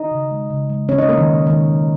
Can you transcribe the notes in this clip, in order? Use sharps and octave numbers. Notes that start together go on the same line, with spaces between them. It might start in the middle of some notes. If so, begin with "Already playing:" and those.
Already playing: D#4 D#5
C#3
G#3
C#3
G#3
C#3 C#4 C#5
D#4 D#5
G#3 A#3 A#4
D#3 D#4
B2
D#3 G#3 D#4
B2